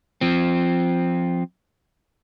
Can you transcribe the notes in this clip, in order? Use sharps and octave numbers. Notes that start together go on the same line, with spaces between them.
F3 C4